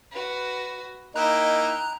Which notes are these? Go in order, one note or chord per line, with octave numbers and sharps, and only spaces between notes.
F#4 B4
A#3 D#4 E4 D#5 G5 A#5 F#6